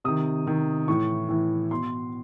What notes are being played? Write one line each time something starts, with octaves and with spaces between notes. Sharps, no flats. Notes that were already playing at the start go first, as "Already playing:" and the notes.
C3 D#3 D#6
C3 D#3
A2 E3 C#6
A2 E3
B2 C6